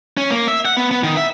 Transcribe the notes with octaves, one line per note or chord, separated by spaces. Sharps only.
C#4
A#3
E5
F#5
B3
B3
D#3
E5